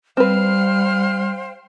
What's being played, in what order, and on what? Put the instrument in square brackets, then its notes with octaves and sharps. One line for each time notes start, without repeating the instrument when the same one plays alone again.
[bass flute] G3 [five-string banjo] C4 B4 [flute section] C5 F5 G5 [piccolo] F6